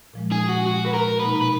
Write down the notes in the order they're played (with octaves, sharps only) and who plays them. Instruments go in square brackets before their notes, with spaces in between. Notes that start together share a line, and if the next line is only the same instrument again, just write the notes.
[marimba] A#2 F3 G#3
[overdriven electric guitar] G#4
F#4
F#4
B4
A#4
[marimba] B2 A#3 D#4 [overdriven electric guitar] B4
[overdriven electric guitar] B4